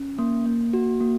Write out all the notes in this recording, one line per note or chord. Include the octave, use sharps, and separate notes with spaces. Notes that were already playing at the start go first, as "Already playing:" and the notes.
Already playing: C#4
A#3
A#3
F#4
A#3